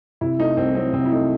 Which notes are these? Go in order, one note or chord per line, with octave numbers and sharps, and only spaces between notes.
C3 E4
A3 D#4
C2 C4
F#3 C4
C3 C4
E4
A3 D#4